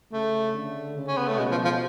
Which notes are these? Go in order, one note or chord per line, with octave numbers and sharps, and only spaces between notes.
C#3 A3
D3
C#3
C#4
B3
A3
B2 G#3
F3
F3